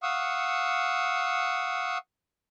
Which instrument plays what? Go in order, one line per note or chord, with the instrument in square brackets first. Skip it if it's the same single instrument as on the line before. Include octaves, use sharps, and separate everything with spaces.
[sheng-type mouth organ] F5 F#5 C#6 D#6 E6